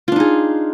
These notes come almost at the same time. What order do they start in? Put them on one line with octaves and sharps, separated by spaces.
F4 D4 D#4 G#4